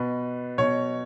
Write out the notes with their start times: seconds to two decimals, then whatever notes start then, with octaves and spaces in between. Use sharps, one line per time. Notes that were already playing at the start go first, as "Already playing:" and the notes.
Already playing: B2 B4
0.58 B2 C#5